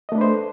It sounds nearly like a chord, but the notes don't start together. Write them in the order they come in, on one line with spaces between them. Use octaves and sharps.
D#5 A3 D4 B4 C5